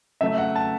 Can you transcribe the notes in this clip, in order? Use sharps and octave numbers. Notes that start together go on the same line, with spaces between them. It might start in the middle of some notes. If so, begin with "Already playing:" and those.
C#3 F#3 A3 E5
F#5
A5